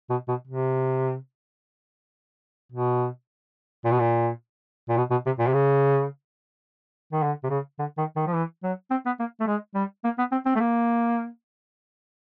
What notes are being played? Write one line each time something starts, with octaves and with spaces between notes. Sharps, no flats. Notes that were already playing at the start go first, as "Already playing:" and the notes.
B2
B2
C3
B2
A#2
B2
A#2
A#2
B2
B2
C3
A#2
C3
C#3
D#3
D3
C3
C#3
D3
D#3
D#3
F3
E3
F#3
C4
B3
A#3
A3
G#3
G3
A#3
B3
C4
C4
A3
A#3